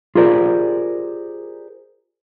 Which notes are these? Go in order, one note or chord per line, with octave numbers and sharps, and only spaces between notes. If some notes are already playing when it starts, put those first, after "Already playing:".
F4 G4 G#4 A#4 C5 D5